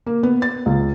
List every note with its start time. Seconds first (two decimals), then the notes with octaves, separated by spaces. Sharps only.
0.06 A#3
0.23 B3
0.42 A6
0.66 C#2